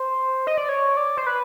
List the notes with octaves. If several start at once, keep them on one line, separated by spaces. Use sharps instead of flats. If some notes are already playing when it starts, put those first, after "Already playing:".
Already playing: C5
D#5
D5
C#5
D5
C5
B4